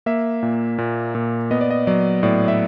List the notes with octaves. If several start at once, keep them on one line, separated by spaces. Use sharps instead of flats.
A#3 E5
A#2
A#2
A#2
B3 D#5
D5
D#5
F#3 D5
A2 D5
E5